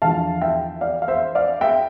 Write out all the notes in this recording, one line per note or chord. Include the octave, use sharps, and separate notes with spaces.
E2 D3 F3 F5 A5
E5 G5
D5 F5
F5
C5 E5
D5 F5
E5 G5